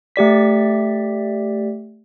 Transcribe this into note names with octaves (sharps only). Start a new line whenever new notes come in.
A3 G4 D5 B6